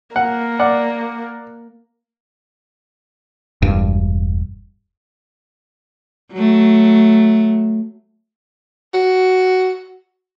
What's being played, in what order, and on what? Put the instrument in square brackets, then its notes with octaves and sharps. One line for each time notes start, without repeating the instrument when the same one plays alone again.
[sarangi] A#3 [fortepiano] F#5
[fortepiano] D5 F#5
[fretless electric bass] E1 G2
[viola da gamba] F#3 A3
[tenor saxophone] F#4